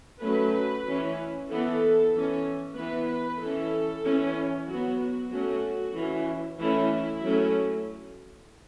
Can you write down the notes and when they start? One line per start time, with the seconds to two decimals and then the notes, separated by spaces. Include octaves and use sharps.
0.23 F#3 A3 C#4 B4
0.87 E3 C#4
1.50 E3 B3 A4
2.14 E3 C#4
2.78 E3 B3 B4
3.10 B4
3.41 E3 C#4 A4
4.05 E3 C#4
4.69 F#3 B3 F#4
5.01 F#4
5.33 F#3 A3 C#4 F#4
5.96 E3 C#4
6.60 E3 A3 C#4 E4
6.92 E4
7.24 F#3 A3 C#4